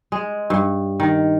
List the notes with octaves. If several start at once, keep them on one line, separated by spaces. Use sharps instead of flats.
G#3
G2
D#3